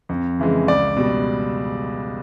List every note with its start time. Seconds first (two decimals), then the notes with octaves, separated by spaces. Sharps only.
0.09 F2
0.39 C#3 E3 G#3
0.68 C#2 D5
0.96 B2 G3